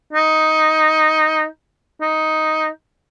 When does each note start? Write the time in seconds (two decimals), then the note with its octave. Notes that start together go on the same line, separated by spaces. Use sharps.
0.13 D#4
2.01 D#4